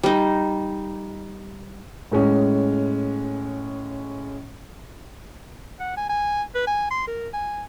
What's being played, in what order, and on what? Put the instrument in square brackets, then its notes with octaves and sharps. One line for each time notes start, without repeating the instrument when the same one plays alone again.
[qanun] G3 D#4
[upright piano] A2 G#3 C#4
[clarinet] F#5
G#5
G#5
B4
G#5
C6
A#4
G#5